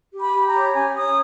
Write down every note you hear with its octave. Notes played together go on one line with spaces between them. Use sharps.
G4
B5
G4
A#5
C#5
C#4 G#5
C#5 D#6